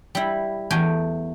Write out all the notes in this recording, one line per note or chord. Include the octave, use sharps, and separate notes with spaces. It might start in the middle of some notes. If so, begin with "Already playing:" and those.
G3 E4
E2 A3 G5 G#5